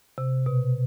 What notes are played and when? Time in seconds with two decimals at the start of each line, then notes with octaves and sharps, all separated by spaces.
0.18 C3
0.46 B2